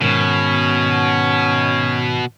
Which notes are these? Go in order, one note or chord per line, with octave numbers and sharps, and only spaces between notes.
G#2 B2 D#3 C#4